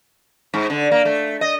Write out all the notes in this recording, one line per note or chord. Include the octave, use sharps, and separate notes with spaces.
G#2
D3
A#3
A3
D#5